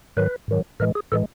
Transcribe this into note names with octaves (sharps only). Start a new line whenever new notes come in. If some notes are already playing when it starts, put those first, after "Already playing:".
G#2 D#3 F#3 B4
G#2 D#3 F#3
A2 E3 G#3 A#4
G#4
A2 E3 G#3 A4